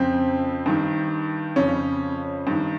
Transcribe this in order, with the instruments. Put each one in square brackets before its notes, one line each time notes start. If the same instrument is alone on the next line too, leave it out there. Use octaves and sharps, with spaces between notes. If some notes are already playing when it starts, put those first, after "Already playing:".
Already playing: [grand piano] F2 C#3 C4
G2 D#3
F2 C#3 C#4
G2 D#3